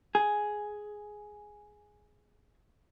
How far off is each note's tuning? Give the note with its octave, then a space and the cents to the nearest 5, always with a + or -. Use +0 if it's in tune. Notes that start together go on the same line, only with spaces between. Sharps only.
G#4 +5